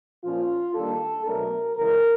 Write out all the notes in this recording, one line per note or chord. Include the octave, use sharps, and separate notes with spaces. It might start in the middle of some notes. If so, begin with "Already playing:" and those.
A#2 F3 A#3 C#4 F4
D#3 G3 A#3 D4 A4
B2 F#3 A3 D4 A#4
C#3 E3 G#3 A#4